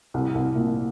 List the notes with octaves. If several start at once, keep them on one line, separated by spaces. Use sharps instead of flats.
C2
C2
A#2